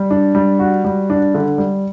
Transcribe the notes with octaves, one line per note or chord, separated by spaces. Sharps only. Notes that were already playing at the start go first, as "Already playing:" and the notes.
Already playing: G3
D4
G3
F#4
G3
D4
D3
G3